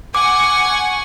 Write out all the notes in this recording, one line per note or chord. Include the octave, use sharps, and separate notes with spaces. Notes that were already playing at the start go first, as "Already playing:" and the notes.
F#5 G#5 C#6 D6